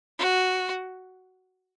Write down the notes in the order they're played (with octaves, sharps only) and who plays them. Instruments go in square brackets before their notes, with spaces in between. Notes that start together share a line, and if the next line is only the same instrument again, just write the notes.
[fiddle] F#4